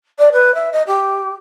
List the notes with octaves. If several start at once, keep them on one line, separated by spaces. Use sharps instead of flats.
D5
B4
E5
D#5
G4